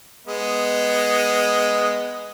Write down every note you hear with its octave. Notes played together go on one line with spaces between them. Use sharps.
G#3 B3 D#5